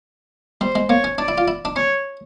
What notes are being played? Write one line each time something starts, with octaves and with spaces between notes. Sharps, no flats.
G3 C5
G#3
A#3 C#5
C#4
D4 D5
E4
F4
E4
D4
C#4 C#5